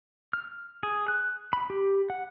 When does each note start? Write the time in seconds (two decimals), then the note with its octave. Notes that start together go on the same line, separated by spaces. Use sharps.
0.33 F6
0.83 G#4
1.08 F#6
1.53 B5
1.70 G4
2.10 F#5